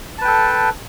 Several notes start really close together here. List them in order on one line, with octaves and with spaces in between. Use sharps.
A5 B4 G5 A4